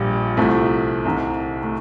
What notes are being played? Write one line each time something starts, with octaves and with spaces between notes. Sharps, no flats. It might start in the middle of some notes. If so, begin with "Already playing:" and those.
Already playing: A#1 A#2 F3 G3
C2 C3 F3 A3
C2 C3 D#3
A3